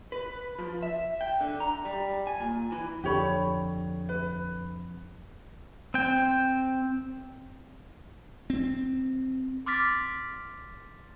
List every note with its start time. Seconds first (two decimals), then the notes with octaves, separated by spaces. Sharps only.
0.12 B4
0.59 F3
0.83 E5
1.21 G5
1.41 D3
1.60 A#5
1.85 G3
2.27 G#5
2.40 A#2
2.72 E3
3.04 F2 D3 G4 C#5 B5
4.09 B4
5.94 C4 G5
8.50 C4
9.66 C6 D6 F6 A6 B6